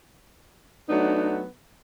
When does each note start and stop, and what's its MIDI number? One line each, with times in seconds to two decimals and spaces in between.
0.90 1.45 54
0.90 1.45 57
0.90 1.45 59
0.90 1.45 62
0.90 1.45 63